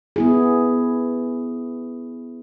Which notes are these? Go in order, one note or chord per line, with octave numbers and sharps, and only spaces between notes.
B3 E4 G#4